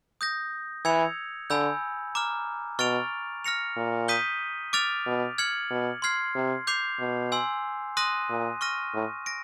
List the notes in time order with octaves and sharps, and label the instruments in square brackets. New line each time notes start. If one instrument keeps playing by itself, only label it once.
[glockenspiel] D#6 G6 A#6
[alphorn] E3 [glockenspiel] E6 G#6 C#7 F7
[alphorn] D3 [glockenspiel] G#5 B5 E6 G6
[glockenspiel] A#5 D6 F6
[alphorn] B2 [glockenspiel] C#6 F6 A6 D7 F7
[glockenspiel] F6 A#6 C#7 F7
[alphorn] A#2
[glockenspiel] D#6 G6 B6 D#7 G7
D6 F6 A6 D7 F7
[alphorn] B2
[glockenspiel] F6 G#6 C#7 F#7
[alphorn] B2
[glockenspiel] C6 F6 G#6 C7
[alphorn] C3
[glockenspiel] D6 G6 C7 F7
[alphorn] B2
[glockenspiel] G#5 C6 E6
C6 D#6 F#6 A#6 D#7
[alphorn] A#2
[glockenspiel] C#6 F6 A#6 D#7
[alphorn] A2
[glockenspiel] A#6 D7